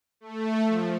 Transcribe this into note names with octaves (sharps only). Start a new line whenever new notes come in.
A3
F3